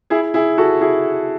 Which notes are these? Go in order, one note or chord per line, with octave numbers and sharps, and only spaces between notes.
E4 G#4
E4 G#4
F#4 A4
E4 G#4